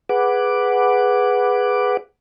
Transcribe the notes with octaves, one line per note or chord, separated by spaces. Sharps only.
G#4 B4 F#5 D6